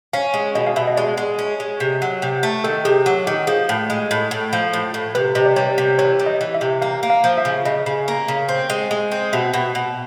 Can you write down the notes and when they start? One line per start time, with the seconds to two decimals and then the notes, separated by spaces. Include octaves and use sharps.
0.13 C#4 F5
0.34 G#3
0.55 B2 D#5
0.67 F5
0.76 B2 E5
0.87 D#5
0.97 G#3 D5
1.18 G#3
1.39 C#4
1.60 G#3
1.80 C3
2.02 F#3
2.22 C3
2.43 A3
2.64 D#3 A4
2.85 C3 G#4
3.06 F#3 G4
3.27 D#3 G4
3.47 F3 G#4
3.69 A2
3.90 G#3
4.11 A2
4.31 A2
4.53 F3
4.73 A2
4.94 A2
5.15 C3 B4
5.35 C3 D#5
5.46 D5
5.56 G3 C#5
5.78 C3
5.98 E3 C#5
6.19 G3
6.26 D#5
6.41 E3
6.54 E5
6.61 C3
6.82 A#3 F5
7.03 A#3
7.10 F5
7.24 F3
7.38 E5
7.45 C#3
7.65 C#3 D#5
7.86 C#3
8.08 A#3
8.28 C#3
8.49 C4
8.70 G#3
8.91 G#3
9.12 C4
9.33 B2 E5
9.54 B2
9.75 B2